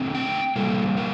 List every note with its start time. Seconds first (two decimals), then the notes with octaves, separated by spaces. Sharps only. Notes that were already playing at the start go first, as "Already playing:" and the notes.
Already playing: D3 A3 C4
0.15 G5
0.56 C3 G3 A#3 A4
0.97 A#4